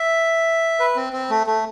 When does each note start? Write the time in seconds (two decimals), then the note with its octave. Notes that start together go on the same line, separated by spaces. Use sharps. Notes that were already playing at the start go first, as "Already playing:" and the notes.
Already playing: E5
0.80 B4
0.96 C4
1.13 C4
1.30 A3
1.47 A3